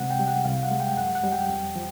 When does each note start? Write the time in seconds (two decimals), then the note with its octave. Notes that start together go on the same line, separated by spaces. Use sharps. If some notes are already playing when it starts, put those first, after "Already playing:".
Already playing: C3 G#3 F#5
0.10 G5
0.19 G3
0.28 F#5
0.45 C2 F5
0.63 F#5
0.71 G#3
0.80 G5
0.97 F#2 F#5
1.15 F#5
1.24 G3
1.32 G5
1.49 F2
1.76 F3